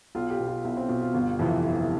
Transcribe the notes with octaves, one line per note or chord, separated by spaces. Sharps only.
B1 F4
G4
B2
F4
B1 E4
C4
B2 F4
F4
G1
F2 C3 E3
G1